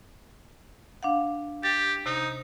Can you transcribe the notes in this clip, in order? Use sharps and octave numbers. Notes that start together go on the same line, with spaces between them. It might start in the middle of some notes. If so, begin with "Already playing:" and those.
D4 F5 F#5
G4 A6
C3 D#4